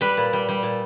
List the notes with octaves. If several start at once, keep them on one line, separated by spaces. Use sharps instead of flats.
G3 B4
A#2
G3
G3
A#2